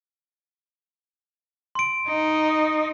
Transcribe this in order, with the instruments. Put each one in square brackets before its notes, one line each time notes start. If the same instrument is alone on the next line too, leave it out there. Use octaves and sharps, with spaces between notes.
[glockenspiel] C6 D7
[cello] D#4